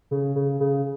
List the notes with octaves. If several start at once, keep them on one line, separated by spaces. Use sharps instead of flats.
C#3
C#3
C#3